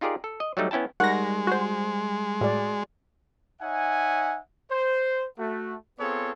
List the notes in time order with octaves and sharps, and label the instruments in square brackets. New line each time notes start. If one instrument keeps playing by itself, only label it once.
[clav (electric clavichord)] D#4 F4 G4 G#4 A#4 D5
A4
D#5
F#3 G3 A3 D#4
B3 C#4 E4 G5 A5
[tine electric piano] G3 [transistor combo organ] G#3 [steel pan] D#4 A#4 C#6 [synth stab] F#5 A#6
[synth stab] F#4 C5
[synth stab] A2 [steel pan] F#4 G#4 D5
[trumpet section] D#4 C#5 E5 F#5 G#5
C5
A3 F#4
B3 C4 F4 G#4 A4 C#5